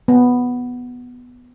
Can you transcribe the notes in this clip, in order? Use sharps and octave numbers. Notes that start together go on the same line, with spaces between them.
B3